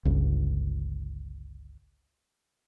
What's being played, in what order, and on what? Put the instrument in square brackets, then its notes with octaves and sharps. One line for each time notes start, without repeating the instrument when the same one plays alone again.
[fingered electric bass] G1 C#2